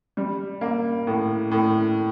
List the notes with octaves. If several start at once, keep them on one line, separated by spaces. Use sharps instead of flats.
G3
A#3
A2
A2